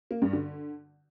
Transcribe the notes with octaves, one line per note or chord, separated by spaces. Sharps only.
A#3
G2
D3